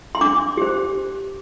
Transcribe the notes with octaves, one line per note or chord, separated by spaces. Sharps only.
C6
D4 D6
G4 C5